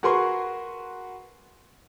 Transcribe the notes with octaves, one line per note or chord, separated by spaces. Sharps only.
F#4 G#4 A#4 B4 C6 C#6